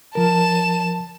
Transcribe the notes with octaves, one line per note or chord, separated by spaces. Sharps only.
F3 A#4 A5 E7